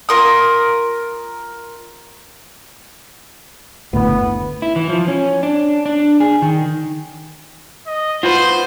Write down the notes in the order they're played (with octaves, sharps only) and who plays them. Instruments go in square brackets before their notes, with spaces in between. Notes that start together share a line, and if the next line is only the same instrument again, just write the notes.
[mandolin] F4 A#4 D#6
[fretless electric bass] F#1 D2 A2 [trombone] B3
[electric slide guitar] E4
E3
F3
C#4
D4
D4
G#4
D#3
[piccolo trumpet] D#5
[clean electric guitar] F4 F#4 B4 [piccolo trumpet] C5